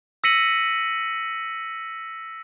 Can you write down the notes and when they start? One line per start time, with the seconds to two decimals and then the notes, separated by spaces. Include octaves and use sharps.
0.24 E6 A#6 B6 C#7 D#7 F#7